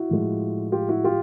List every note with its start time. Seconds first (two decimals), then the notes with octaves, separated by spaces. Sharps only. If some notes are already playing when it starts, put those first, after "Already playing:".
Already playing: E4 F#4
0.09 A2 F3 G#3
0.72 F4 G4
0.89 E4 F#4
1.04 F4 G4